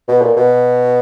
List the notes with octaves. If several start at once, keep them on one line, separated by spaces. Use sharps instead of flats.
B2
A#2
B2